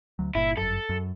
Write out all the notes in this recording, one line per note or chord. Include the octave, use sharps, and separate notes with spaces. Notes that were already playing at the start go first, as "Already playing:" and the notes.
D2 F#3
G1 A#2 E4
G1 F#2 A4
F#2